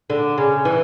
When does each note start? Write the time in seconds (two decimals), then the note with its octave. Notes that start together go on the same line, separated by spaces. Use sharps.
0.10 D3
0.38 C#3
0.65 E3